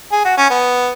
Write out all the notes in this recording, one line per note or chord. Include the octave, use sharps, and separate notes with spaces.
G#4
F#4
C#4
B3